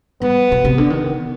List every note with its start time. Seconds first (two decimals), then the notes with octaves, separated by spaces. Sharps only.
0.22 G3 B3
0.52 B2
0.65 C3
0.78 D3
0.90 D#3 B3